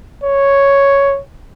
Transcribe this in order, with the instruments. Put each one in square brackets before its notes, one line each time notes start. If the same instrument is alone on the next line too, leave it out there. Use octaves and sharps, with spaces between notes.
[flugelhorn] C#5